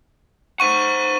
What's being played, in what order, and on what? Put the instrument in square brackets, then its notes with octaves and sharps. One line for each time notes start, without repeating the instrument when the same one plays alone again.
[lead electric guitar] C5 F#5 [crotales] C#6 D#7